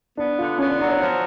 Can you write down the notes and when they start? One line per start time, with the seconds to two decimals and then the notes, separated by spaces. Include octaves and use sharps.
0.17 B3 D4
0.38 D3 F4
0.58 B3 C#4
0.69 D4
0.79 F#3 D4
0.89 C#5
1.00 F3 C#5